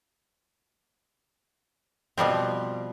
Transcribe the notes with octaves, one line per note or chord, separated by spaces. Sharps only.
B2 F3 G3 C4